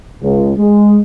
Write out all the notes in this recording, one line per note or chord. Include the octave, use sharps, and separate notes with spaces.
C#2
G#3